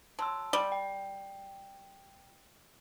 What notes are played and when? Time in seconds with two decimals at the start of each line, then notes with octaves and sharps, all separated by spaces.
0.19 F#3 A5 C6 E6
0.53 G3
0.72 G5